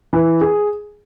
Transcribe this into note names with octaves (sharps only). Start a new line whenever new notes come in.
E3
G#4